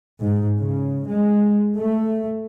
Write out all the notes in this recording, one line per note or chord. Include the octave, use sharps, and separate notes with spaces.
G#2
C#3
G#3
A3